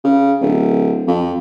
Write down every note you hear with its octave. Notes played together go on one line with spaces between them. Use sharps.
C#3
D1
F2